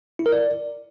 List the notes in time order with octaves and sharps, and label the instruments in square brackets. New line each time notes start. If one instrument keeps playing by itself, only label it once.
[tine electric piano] E4
A#4
D5